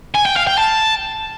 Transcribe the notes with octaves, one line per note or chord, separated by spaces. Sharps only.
G#5
G5
F5
G5
A5